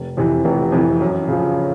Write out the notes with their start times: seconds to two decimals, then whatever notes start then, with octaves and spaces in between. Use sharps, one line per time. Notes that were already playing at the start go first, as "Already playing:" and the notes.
Already playing: F1
0.17 F2 C3 E3
0.45 F1
0.72 F2 C3 E3
1.00 F#2
1.28 C#3 F3